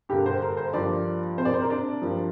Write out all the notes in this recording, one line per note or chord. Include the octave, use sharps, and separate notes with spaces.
G2 D3 A#3 G4
C5
A#4
C5
G2 F3 A#3 D5
C3 A#3 C5 D5
C5
A#4
D4
G2 F3 A#3